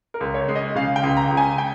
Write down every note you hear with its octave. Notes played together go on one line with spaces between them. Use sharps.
A#4
C#2
C#5
G#3
D#5
C#3 F5
G5
C#2
A#5
C#2
G#5
G5